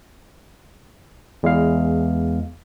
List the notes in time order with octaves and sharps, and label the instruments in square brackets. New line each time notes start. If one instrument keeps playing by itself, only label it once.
[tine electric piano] E2 G#3 F5